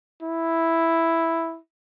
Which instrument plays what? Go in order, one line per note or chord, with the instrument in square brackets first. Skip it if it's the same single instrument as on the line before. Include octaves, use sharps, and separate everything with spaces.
[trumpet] E4